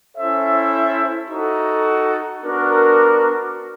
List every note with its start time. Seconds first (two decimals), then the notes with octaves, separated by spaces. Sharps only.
0.16 C#4 E4 A4 C5 E5
1.28 D#4 F#4 A4
2.41 B3 D4 F#4 A#4